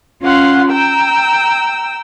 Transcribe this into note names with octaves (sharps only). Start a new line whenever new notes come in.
C#4 F4 F5 F#5 C6
G5 A#5 E6